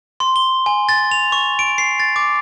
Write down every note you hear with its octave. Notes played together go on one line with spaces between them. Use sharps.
C6
G7
G#5
A6
F7
C#6
D7
C7
A6
D6